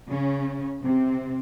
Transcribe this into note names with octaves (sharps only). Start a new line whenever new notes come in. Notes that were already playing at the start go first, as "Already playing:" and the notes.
C#3 C#4
C3 C4